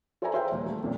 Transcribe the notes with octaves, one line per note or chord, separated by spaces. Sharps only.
A4 C5 D5 E5 G#5 A#5
G#4 C5 E5 F5 G5
D#1 D#2
A3
D#1 F2 A#2